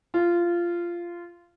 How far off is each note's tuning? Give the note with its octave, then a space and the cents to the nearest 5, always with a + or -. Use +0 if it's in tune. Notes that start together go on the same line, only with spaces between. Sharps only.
F4 -15